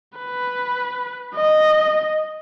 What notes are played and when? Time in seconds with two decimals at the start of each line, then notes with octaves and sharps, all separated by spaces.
0.18 B4
1.35 D#5